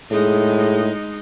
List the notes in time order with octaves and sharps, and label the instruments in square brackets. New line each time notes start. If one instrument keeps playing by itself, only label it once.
[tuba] A2 [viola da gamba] G#3 D#4 [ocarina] G#4